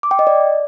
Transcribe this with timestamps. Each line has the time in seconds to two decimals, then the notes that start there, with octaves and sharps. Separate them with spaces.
0.03 D6
0.11 G5
0.19 D#5
0.27 D5